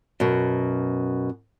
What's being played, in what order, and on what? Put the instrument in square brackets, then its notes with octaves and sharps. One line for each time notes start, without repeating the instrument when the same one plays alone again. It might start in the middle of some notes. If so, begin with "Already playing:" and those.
[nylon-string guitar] F#2 B2